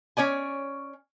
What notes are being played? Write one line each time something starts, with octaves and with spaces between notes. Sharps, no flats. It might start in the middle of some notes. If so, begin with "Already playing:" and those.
C#4 C#5 D5 G#5